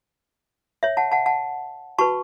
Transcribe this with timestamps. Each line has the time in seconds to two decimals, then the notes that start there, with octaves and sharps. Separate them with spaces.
0.83 C#5 E5
0.97 F#5 A5
1.12 F#5 A5
1.26 F#5 A5
1.98 F#4 B4 A5 C#6